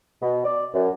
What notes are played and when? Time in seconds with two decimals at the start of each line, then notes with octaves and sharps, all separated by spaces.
0.22 B2
0.44 D5
0.74 F#2